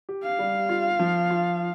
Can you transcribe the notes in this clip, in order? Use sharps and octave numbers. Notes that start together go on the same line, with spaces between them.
G4
F5
G3
F4
F3
F4